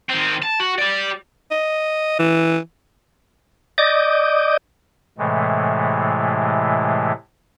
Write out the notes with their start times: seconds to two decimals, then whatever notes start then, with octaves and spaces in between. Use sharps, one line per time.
0.10 D#3 C4
0.42 A5
0.60 F#4
0.79 G4 D5
1.51 D#5
2.19 E3
3.78 D5 D#5 D6 D#6 G6
5.18 A2 C3 E3 G#3 A3